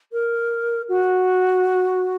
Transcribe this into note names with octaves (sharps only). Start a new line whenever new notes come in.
A#4
F#4